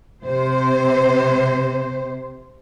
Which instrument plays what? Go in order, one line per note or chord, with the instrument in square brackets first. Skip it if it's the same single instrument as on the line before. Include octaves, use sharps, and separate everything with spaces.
[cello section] C3 C5